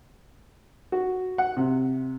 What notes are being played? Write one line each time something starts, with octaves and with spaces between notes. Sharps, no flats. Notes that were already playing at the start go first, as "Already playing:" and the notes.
F#4
F#5
C3